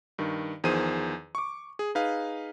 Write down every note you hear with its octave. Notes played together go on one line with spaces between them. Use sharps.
G2 D#3
E2 D#3 F3 G#4 C5 D#7
C#6 D6
G#4
D#4 G#4 B4 F5